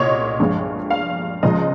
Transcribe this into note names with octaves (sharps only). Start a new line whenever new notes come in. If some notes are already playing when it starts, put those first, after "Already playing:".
Already playing: C2 A#2 C#5 D#5
G2 F3 G#3
F5
C#2 C#3 F3 G#3 D#5